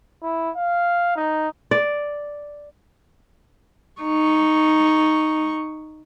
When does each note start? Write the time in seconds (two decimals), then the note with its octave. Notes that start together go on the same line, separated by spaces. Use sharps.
0.23 E4
0.56 F5
1.16 D#4
1.71 D5
4.02 D#4 C#6